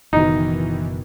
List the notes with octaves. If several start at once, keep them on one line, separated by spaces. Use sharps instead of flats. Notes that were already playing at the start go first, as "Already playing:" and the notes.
F#1 B2 D#3 E3 D#4